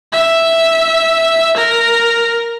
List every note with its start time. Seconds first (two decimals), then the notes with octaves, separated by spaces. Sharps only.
0.13 E5
1.57 A#4